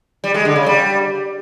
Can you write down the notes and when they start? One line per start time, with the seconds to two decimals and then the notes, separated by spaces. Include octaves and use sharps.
0.24 G3
0.34 G#3
0.45 D3
0.56 C#3
0.66 G3